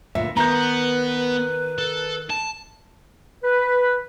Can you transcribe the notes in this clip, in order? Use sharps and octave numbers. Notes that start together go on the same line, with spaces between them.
D2 G2 A#2 E5
D#3 B3 B4 A#5 G6
A4
A5
B4